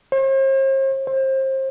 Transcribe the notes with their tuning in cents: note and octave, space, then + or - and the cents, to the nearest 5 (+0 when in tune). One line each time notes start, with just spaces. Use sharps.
C5 +45
C5 +30